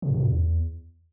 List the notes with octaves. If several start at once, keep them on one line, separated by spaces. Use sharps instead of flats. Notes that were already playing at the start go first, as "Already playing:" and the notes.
C3
F#2
A#2
G#2
E2